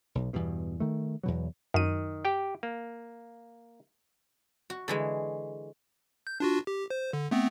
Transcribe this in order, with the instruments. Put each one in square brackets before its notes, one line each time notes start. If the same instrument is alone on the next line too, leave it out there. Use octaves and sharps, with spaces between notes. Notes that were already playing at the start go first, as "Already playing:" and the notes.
[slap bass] B1
E2 G2 B2
D#3 A3
E2 B2 F#3
[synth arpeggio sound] F#2 D#7 [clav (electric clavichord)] D#3
[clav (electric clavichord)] G4 G5
A#3
[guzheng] F#4
D3 E3 G#3
[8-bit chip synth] G6
D4 F4 F#4
G4
C5
D3
A3 B3 C4